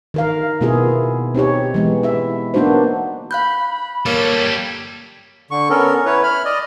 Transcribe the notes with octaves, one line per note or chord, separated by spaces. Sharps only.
D#3 A#4 F5
B2 A#3 B3 E4 F4 G#4
C4 D#4 G4 C#5
E3 G#3 B3
E4 E5
A#3 B3 D4 D#4 F#4 C5
F5 B5 F#6 G6
B5
G3 A#3 A4 C#5
D3 C#6
B3 C#4 A4 A#4
E4 B4 C#5
B5 F6
D5 D#5